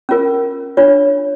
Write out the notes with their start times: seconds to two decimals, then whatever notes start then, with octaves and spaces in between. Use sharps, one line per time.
0.09 C#4 F4 A#4
0.77 D4 F4 C#5